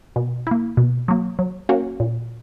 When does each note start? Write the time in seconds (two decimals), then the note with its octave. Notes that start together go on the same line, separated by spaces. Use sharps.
0.16 B2
0.47 A#3 E4
0.77 B2
1.08 F#3 A#3
1.39 F#3
1.69 A#3 C#4 F#4
2.00 A#2